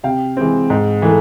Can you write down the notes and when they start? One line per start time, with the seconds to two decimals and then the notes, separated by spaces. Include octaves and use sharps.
0.04 C3 F5 G5
0.37 E3 G#3 C4
0.70 G#2
1.02 E3 A3